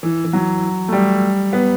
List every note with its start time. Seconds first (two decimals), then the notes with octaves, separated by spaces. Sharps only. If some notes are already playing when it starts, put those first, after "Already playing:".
0.03 E3
0.25 E3
0.33 F#3
0.88 A3
0.93 G3
1.53 B3